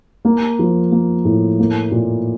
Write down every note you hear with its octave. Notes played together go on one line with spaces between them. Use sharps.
A#3
F3
A#3
A2
A#3
A#2